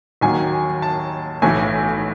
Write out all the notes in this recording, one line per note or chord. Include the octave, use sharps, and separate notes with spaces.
D#2 D#3 F#3 G#5
A5
B1 A2 E3 G#5